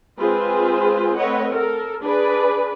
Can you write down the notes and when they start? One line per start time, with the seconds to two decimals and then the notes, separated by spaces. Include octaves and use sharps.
0.17 G#3 C4 F4 G#4 B4 C5
1.18 A3 C4 B4 C#5 D#5 F#5
1.53 A4 A#4
2.03 D4 G#4 B4 D5